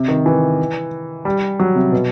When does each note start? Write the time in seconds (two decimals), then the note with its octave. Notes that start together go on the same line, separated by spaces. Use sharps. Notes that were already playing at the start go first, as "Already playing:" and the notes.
Already playing: C3
0.08 D#3
0.26 E3
1.25 G3
1.60 F#3
1.75 C3
1.92 B2